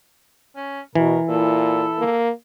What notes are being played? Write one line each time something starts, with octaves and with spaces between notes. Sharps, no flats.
C#4
B2 E3 A#4
A#2 E4 A4
A#3